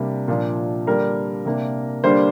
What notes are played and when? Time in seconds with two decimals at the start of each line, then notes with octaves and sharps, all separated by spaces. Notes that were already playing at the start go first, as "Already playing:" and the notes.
Already playing: C3 G3 A#3 D4
0.28 A#2 F3 D4
0.87 D3 G3 A#3 D4 A#4
1.45 C3 A#3 D4
2.04 D3 G3 A#3 D4 C5